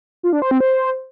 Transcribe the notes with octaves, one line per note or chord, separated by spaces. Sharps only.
F4
D4
C5
C4
C5